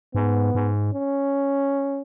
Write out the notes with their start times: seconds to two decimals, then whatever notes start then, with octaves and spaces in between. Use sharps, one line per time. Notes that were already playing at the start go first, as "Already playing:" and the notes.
0.14 G#2 B3
0.55 G#2
0.94 C#4